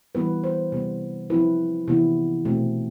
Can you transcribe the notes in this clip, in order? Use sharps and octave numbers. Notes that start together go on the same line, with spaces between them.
E3 G3 B3 E4 B4
C5
C3 G3 B3
F3 C4 E4 B4
C3 E3 B3 E4
B2 A3 C4